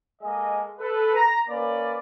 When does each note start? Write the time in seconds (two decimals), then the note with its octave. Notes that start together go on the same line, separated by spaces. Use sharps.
0.22 G#3 A#3 A4 D#5
0.79 A4 B4
1.15 A#5
1.49 A#3 C#4 B4 D5